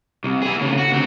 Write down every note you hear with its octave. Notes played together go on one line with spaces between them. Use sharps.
C2
E4 G#4
A2 C#3
F#4
D2 C4